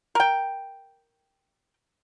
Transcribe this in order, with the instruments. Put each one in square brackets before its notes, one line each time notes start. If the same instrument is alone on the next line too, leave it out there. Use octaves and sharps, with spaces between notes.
[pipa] A#4 G5